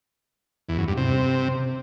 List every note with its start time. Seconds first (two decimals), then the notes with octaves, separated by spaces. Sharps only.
0.69 E2
0.78 F#2
0.88 G2
0.97 C3